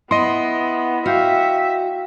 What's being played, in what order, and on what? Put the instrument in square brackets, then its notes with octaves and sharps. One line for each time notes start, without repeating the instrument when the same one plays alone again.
[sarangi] B3 [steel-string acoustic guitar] E4 [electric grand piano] D#5 C6
[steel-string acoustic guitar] F#4 [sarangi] E5 [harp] F5 G5